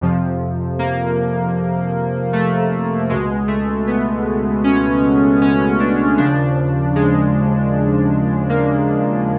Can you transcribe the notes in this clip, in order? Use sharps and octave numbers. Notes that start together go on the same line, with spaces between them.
F2 C3 F3
A#3
A3
C#2 B2 G#3
A3
B3
C#4
C#4
D4
D#2 C#3 F3 D4
G#3
A#3